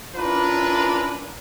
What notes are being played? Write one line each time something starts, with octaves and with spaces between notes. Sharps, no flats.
C#4 D4 E4 F4 A#4 B4